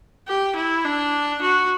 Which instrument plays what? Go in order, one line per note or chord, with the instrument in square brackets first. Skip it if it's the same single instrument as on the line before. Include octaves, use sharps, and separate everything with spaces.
[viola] G4
E4
D4
F#4